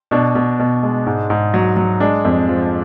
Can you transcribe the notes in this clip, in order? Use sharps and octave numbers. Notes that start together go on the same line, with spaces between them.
B2 D4
B2
B2
G#3
G#2
G#2
F#3
F#3
G#3 D4
F2
F3